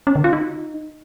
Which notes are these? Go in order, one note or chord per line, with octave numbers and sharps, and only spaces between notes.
C#4
D3
F4
D#4